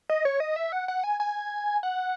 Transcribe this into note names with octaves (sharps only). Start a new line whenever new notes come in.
D#5
C#5
D#5
E5
F#5
F#5
G#5
G#5
F#5